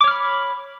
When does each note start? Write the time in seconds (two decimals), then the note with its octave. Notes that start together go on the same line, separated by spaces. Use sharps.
0.01 D6
0.04 C#5
0.08 F6
0.11 B5